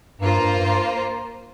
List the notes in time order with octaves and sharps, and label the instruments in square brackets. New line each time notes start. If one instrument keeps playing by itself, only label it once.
[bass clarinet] G2 [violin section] A#3 F4 C5
[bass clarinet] G2
G2